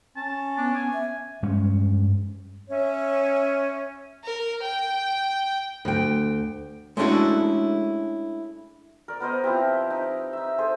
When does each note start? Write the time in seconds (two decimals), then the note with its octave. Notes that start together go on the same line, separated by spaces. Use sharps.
0.16 C#4 A5
0.58 B3 D4
0.75 B3 G#5
0.93 E5
1.43 G2 G#3 C#4
2.69 C#4 C#5 E5
4.24 A#4
4.62 G5
5.85 D2 G5
6.97 G#3 A3 C#4 D4 E4 F#4
9.08 A#4 D5
9.20 B3 A#4 C5 D#5
9.44 F3 C4 E4 G4
9.90 D#4
10.33 D#4 E5
10.58 G#4 A4 C5